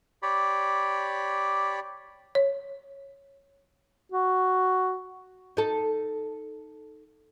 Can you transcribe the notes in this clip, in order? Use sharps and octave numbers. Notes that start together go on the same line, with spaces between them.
G4 C#5 D5 B5
C#5
F#4
D#4 A4